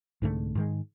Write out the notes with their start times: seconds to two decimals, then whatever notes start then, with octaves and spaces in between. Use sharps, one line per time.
0.22 C2 G#2 D3 A3
0.55 G#2 D#3 G#3